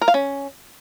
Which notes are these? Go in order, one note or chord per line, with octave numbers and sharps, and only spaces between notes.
A#4
F5
C#4